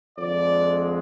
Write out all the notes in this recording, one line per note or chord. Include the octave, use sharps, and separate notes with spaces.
F2 D3 G#3 D5